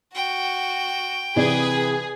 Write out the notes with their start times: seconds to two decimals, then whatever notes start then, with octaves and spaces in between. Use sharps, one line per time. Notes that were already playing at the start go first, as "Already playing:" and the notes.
0.15 F#4 G5
1.36 C3 E3 G#4 B4 D5